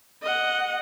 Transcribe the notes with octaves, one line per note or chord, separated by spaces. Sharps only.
D#5 F#5